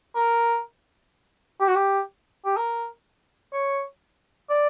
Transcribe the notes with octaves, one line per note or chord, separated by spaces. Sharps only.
A#4
G4
F#4
G4
G4
A#4
C#5
D5